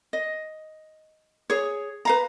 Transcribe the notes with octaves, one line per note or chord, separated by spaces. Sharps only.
D#5
G#4 C#5
B4 F5 A#5